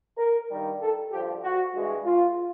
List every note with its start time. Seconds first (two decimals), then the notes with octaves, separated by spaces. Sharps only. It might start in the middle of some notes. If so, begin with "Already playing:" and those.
0.18 A#4
0.49 G2 D#3 G3
0.81 A4
1.12 G2 D3 F3 G4
1.43 F#4
1.74 G2 E3 G#3
2.05 F4